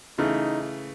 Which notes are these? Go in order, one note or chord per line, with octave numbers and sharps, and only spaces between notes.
C#3 E3 A3 D#4